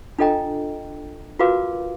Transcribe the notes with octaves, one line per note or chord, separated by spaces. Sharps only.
D4 F4 A4 D#5 G5 A#5
F4 F#4 A#4 B4 F5 D6